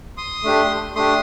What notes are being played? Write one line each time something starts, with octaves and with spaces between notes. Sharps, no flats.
C6 D#6
A3 D4 G4
A3 D4 G4 C6 D#6